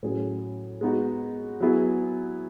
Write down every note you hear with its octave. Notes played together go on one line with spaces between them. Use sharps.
A2 F#3 C#4 G#4
G#3 B3 D#4 F#4
F#3 B3 E4 G#4